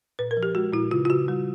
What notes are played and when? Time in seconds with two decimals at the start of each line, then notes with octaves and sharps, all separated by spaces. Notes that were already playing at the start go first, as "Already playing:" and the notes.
0.19 A#2 B4
0.31 A#4
0.37 F3
0.43 G4
0.55 G#3 F#4
0.73 A#2 E4
0.91 C#3 F4
1.05 F4
1.10 C#3 F#4
1.28 G3